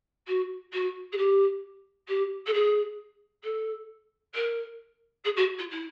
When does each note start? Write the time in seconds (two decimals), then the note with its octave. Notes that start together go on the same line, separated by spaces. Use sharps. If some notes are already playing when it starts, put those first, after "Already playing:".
0.27 F#4
0.73 F#4
1.12 G#4
1.17 G4
2.08 G4
2.46 A4
2.53 G#4
3.43 A4
4.34 A#4
5.24 G#4
5.36 F#4
5.58 F4
5.70 E4